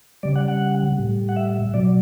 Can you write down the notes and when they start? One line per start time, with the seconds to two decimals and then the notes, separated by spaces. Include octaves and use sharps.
0.23 C#3 G3 D5
0.36 F#5
0.48 F#5
0.98 A2 G3
1.29 F#5
1.36 E5
1.74 B2 F#3 D5